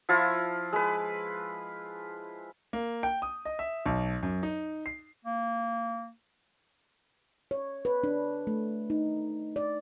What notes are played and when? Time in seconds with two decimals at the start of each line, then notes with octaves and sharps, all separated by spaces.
0.09 F3 E4 F4
0.73 G#3 B4
2.73 A#3
3.03 G5
3.22 D#6
3.45 D#5
3.59 E5
3.86 B1
4.23 F#2
4.43 D#4
4.86 C7
5.25 A#3
7.51 C#5
7.85 B4
8.04 D4
8.47 A3
8.90 D#4
9.56 D5